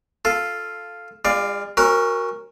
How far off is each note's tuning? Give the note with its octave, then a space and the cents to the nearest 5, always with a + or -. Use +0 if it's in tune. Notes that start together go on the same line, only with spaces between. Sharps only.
F4 +0 A4 +0
G#3 -40 F4 +0 D5 +15
C#4 -35 F#4 +0 A#4 +0